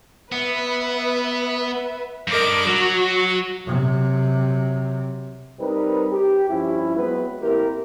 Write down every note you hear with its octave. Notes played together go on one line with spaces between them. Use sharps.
B3 B4 E5
G2 A#4 D#5 D6
F#3 F#4
C3 F#3
G3 C4 D#4 A#4 B4
G4
G2 F3 C#4 E4
F#3 G#3 B3 C4 B4
A1 A#3 C4 E4 G4 A#4